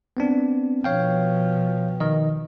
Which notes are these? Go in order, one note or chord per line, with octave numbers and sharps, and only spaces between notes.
B3 C4 D4
B2 F3 C#5 F5 G5
D#3 D#5